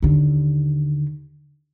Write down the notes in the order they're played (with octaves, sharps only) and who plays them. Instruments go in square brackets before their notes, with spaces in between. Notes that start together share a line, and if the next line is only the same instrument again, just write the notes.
[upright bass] D#2 D3